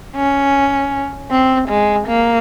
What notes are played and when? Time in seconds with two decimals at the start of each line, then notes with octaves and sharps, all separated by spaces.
0.16 C#4
1.31 C4
1.69 G#3
2.07 A#3